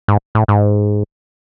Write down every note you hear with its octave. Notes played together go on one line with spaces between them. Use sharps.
G#2
A2
G#2